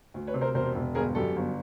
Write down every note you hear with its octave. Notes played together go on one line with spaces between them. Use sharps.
D2
B4 C#5
C3
A#4 C5
E1 A#4 C5
E1
G1 G#4 A#4
F#2 G4 A4
G1